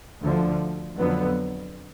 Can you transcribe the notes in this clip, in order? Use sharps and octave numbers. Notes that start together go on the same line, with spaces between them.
D2 D3 F3
F2 D3 F#3 B3